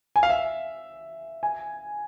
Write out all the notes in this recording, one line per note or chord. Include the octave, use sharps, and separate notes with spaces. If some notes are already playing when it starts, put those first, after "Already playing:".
G#5
F5
E5
G#5